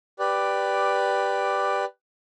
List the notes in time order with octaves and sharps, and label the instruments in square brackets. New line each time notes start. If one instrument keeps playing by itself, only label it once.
[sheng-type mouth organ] G4 B4 D5